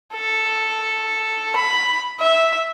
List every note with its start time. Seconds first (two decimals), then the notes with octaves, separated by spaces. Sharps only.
0.13 A4
1.56 B5
2.20 E5